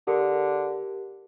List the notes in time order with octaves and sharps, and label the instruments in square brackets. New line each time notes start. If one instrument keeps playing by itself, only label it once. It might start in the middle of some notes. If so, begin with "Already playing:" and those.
[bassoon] D3 [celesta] G4 A#4